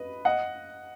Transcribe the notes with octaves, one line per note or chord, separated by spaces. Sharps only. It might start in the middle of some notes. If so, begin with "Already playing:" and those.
Already playing: B4 D#5
D#5 F#5